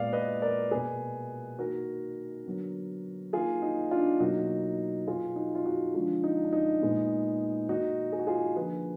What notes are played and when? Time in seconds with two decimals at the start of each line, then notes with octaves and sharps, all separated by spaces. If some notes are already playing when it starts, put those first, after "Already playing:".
Already playing: A#2 G#3 B3 D5 F5
0.13 B4 D#5
0.42 A#4 D5
0.71 B2 A#3 G#4 B4
1.59 D#3 A#3 F#4 A#4
2.46 D3 F#3 B3
3.33 D#3 A#3 F4 G#4
3.62 D#4
3.91 D4 F4
4.20 B2 F#3 A#3 D#4 F#4
5.07 B2 F#3 B3 F4 G#4
5.36 D#4 F#4
5.55 F4
5.66 D#4 F#4
5.94 D3 F3 G#3 D4 F4
6.24 D#4
6.44 D4
6.53 D#4
6.81 A#2 G#3 B3
7.69 D#3 A#3 D#4 F#4
8.12 G#4
8.19 F#4
8.27 F4 G#4
8.57 D3 F3 A#3 G#4 B4